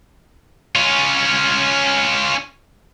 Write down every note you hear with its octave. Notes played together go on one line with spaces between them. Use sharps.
C#4 F4